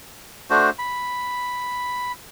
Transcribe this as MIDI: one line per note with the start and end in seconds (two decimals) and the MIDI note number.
0.50 0.70 57
0.50 0.70 62
0.50 0.70 66
0.50 0.70 72
0.79 2.12 83